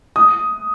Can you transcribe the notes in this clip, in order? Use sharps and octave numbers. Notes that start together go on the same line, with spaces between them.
D#6